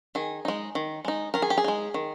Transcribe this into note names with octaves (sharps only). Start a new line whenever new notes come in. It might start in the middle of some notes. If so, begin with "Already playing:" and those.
D#3 G#4
G#3 D#4
D#3
G#3 D#4
D#3 A#4
G#4
G4
G#4
G#3 D#4
D#3